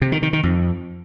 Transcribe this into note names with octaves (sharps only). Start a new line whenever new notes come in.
C3
D#3
D#3
D#3
F2